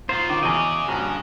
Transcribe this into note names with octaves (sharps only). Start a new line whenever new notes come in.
D#4 F4 F#4 C5 F5
D#3 D6
E2 C#3 C#4 F#4 G#4 D#5
A#1 G2 F#4